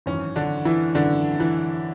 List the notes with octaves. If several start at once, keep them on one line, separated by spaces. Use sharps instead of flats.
G#1 F#2 E3 C#4
D3 D4
E3 E4
G#1 F#2 D3 E3 D4
E3 E4